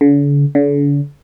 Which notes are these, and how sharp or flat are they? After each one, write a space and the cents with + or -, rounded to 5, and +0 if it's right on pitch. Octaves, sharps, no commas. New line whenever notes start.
D3 -45
D3 -40